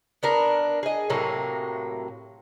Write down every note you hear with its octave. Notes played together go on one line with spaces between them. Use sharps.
B3 D4 A#4
G#4 D#5
A2 C3 F#3 A#3